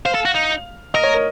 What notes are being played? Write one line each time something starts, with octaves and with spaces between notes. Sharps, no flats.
C5 F5
A4
F#4
D#4
A#4 D#5
C#5
A#4